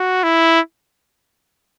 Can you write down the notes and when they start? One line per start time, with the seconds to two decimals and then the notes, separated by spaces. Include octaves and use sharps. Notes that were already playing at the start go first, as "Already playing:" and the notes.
Already playing: F#4
0.23 E4